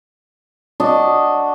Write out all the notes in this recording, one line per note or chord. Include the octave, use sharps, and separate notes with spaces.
D4 F#4 D#5